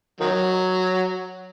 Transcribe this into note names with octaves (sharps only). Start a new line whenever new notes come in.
D#3 F#3